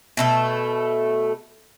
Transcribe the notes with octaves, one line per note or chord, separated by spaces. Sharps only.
B2 A3 A4